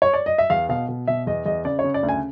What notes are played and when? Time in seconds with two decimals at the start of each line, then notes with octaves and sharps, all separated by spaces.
0.02 C#5
0.14 D5
0.26 D#5
0.38 E5
0.50 E2 F5
0.69 B2 F5
0.88 B2
1.07 B2 E5
1.27 E2 D#5
1.46 E2 D#5
1.65 C#3 D5
1.79 C#5
1.84 C#3
1.94 D5
2.03 D2
2.09 G#5